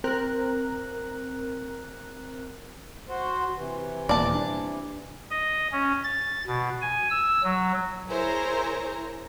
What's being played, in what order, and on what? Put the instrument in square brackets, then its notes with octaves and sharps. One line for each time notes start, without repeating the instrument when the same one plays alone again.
[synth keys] C4 A#4 F#6
[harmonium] F#4 C5
C3 E3
[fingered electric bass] D#1 E2 A#3 [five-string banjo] D5 A5
[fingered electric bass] D4
[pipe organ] D#5
C#4
A6
B2
G#5
E6
F#3
[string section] E4 G#4 A#4 C5 C#5 A#5